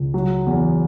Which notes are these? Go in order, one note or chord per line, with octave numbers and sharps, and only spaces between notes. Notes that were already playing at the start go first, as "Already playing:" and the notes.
Already playing: C#2
F#3
E2